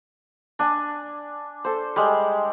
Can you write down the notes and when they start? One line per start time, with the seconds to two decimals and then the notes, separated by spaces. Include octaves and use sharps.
0.59 D4 G#5
1.64 A4 C5
1.96 G3 G#3